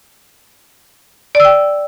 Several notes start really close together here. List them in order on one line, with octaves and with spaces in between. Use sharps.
D5 E6 G5